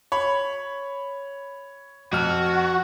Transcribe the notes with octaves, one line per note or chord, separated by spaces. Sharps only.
C#5 B5
F2 F#4 F6